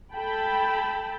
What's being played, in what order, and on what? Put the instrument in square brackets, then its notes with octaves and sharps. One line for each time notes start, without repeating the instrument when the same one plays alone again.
[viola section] A4 G5 A5 B5